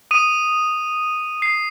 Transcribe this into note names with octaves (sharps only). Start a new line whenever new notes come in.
D#6 D#7
C7